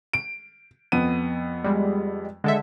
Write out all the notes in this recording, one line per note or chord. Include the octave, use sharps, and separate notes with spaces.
D7
F2 B3 D#7
G3 G#3
D3 G#3 A4 E5